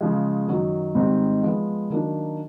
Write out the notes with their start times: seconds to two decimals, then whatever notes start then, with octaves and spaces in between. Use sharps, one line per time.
0.01 C#3 F3 G#3
0.48 F#2 D#3 F#3
0.95 G#2 D#3 G3 C4 D#4
1.43 F3 G#3 B3
1.90 D#3 F#3 A#3 D4